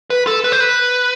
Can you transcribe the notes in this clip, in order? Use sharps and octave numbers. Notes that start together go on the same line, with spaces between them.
B4
A4
B4
C5
B4